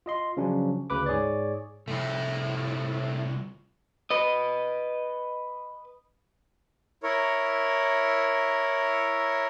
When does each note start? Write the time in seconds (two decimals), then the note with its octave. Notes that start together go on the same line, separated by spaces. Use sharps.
0.06 F4 D#5 C6
0.37 C#3 F3 F#3 C#4 D4
0.90 D2 C#3 B4 B5 D6
1.06 G#2 G#4 C#5 D5
1.88 C2 F3 A3 E4
4.11 B4 D#5
7.03 E4 A#4 C#5